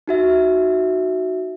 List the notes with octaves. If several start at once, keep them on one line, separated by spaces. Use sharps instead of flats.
D#4 F#4 E5